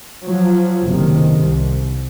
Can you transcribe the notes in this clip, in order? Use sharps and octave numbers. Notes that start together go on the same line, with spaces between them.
F3 F#3
F#1 C3 D#3
C2